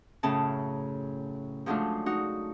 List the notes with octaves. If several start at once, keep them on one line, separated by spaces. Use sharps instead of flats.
F#2 A2 C#3 A5
F3 F#3 G#3 A3 D4 F4
D#4 F#4